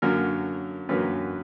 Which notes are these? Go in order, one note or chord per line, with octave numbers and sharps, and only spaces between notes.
F#2 D3 F#3 A#3 A#4
F#2 D3 F#3 A#3 B4